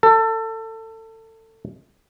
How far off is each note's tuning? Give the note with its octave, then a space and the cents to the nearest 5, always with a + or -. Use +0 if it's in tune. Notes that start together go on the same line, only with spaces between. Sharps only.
A4 +25